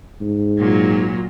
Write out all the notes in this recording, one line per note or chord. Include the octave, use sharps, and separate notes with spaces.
G#2
A#2 F#3